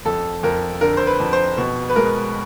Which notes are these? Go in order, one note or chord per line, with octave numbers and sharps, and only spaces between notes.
F2 A4
F2 A#4
D3 A#4
C5
B4
F2
C5
B2
B4
G#3 A#4